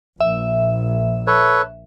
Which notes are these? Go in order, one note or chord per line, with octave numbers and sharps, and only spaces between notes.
A#1 E5
A4 B4 C#5